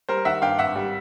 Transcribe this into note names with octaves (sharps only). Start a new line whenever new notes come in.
G3 A#4 C5
D#3 E5 F#5
G2 F5 G5
G#1 E5 F#5
G3